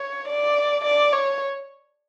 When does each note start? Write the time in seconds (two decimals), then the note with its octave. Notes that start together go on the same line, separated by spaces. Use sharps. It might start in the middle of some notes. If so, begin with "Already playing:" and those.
Already playing: C#5
0.28 D5
0.85 D5
1.13 C#5